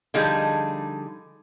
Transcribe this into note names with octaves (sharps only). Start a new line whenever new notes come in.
D3 F3 G3 D#4 G#4